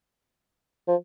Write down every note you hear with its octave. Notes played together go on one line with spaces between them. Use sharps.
F3